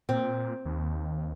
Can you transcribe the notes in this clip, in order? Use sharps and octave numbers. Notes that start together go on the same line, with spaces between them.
A#2 C4
D#2